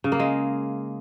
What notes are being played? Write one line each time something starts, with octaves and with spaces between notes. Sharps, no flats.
C#3
A#3
G#3